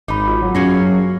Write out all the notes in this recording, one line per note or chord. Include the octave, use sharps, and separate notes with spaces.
G#1 D#4 B5 D6
F4 F#4
F#3
F#2 A#3 C#4 G#4 A#6